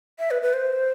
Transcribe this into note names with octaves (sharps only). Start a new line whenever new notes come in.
E5
B4
B4
C5